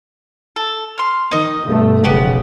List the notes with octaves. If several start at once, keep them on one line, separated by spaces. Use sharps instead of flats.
A4
C6 F6
D#3 D#4 D#5
G2 B2 A3
F1 B1 C#3 B3 G4 F#5